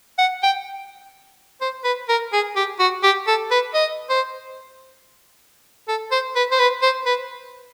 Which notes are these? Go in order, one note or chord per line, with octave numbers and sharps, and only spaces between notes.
F#5
G5
C5
B4
A#4
G#4
G4
F#4
G4
A4
B4
D#5
C5
A4
C5
B4
C5
B4
C5
B4